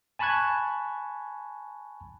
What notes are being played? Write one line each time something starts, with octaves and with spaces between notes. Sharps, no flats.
G#5 A5 B5 C#6 F#6 G#6